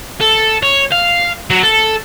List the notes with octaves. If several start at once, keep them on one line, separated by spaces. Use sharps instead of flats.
A4
C#5
F5
F#3
A4